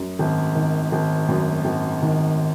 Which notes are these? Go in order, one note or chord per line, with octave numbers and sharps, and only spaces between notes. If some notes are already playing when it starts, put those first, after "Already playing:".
Already playing: F#2
G#1
D#3
G#1
F#2
G#1
D#3